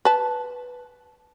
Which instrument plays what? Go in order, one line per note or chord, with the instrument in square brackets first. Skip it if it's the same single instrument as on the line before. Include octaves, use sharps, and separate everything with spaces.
[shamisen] B4 A5